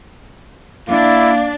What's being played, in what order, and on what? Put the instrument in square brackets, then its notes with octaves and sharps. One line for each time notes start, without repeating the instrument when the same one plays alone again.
[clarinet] A#3 [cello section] D4 [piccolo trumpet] E4